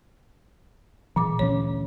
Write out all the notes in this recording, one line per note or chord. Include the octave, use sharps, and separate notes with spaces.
A#2 E3 D6
D2 E3 C#4 C#5